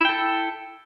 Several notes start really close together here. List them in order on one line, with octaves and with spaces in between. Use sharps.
E4 G5 A4